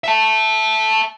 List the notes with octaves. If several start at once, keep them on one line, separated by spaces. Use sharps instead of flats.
E5 A5